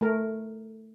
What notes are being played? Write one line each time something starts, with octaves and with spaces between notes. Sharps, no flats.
A3 A#4